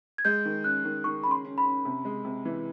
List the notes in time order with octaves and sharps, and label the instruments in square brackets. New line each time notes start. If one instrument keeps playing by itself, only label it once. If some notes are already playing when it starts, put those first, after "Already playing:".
[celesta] G#6
[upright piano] G#3 [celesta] G6
[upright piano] D#3
[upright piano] C#4 [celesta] F#6
[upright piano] D#3
[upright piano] D#3 [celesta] C#6
[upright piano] C#4 [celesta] B5
[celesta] C6
[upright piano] C#4
[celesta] B5
[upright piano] C#4
C3
G#3
C3
E3